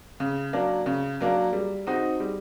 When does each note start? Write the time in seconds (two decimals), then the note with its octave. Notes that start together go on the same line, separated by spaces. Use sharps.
0.20 C#3
0.53 F#3 A#3 D4
0.86 C#3
1.20 F#3 A#3 D4
1.53 G3
1.87 C4 D#4 F#4
2.20 G3